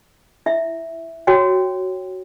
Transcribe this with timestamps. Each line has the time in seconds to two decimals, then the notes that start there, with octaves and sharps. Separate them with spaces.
0.46 E4 E5
1.27 F#4 C#5 G5